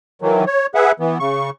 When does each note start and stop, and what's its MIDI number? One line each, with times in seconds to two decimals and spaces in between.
0.22 0.45 51
0.22 0.45 52
0.22 0.45 54
0.46 0.66 73
0.75 0.92 68
0.75 0.92 71
0.75 0.92 76
0.75 0.92 78
1.00 1.18 52
1.00 1.18 59
1.20 1.50 49
1.20 1.50 85